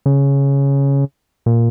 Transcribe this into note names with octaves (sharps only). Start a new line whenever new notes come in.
C#3
A#2